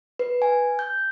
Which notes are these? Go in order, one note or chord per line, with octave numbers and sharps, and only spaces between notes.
B4
G#5
G6